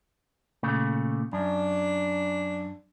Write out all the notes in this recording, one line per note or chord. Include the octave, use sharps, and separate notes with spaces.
A#2 C#3 A3
F#2 D4